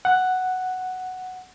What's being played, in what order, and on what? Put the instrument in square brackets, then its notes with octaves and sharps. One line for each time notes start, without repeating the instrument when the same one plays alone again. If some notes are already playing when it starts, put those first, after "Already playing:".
[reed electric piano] F#5